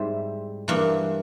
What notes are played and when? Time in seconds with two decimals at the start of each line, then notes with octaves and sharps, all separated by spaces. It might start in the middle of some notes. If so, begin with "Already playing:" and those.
Already playing: G#2 G3 C4 E4
0.68 G2 E3 A#3